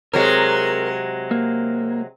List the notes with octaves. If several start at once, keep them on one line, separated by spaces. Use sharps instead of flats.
C3 F#3 G#3 A#4
A#3